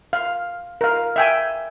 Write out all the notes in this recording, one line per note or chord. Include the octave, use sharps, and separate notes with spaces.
F5
A#4 F5
E5 G5 G#5